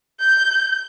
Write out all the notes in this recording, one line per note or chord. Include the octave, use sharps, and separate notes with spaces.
G6